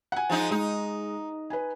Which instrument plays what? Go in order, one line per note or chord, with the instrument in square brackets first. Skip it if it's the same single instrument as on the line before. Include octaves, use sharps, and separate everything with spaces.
[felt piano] F#5 G#5
[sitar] F3 G#3 D#4
[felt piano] G#3 [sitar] D#4
[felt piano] B4 G#5